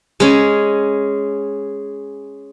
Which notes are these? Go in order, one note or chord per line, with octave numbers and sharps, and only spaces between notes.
G#3 C#4